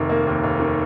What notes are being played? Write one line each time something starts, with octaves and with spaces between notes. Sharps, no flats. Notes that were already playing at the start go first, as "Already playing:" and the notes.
Already playing: F1 D#3
A#3
D#2
F1
D#3